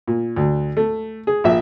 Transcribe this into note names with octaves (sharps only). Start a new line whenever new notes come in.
A#2
D2
A3
G#4
A#1 E5